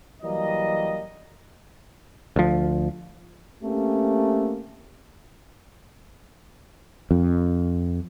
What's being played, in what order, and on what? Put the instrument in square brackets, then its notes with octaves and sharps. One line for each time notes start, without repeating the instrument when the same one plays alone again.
[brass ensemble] E3 F#3 G3 A#3 D#5
[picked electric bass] D2 F3
[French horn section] A3 A#3 C4 C#4 G4
[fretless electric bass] F2